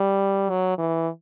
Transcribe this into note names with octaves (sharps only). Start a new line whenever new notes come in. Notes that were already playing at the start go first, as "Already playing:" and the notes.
Already playing: G3
F#3
E3